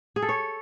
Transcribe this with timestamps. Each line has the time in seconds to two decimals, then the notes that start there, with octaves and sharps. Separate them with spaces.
0.16 G#4
0.22 A4
0.29 C#5